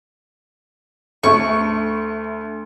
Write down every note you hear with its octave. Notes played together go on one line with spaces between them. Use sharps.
D2 A3 C#6